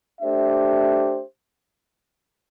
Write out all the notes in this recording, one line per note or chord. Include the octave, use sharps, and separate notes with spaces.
A3 D4 G4 C5 E5